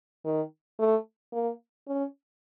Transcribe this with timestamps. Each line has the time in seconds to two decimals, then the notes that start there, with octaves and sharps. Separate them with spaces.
0.25 D#3
0.79 A3
1.33 A#3
1.88 C#4